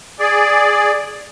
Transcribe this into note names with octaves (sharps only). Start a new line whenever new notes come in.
G#4 D5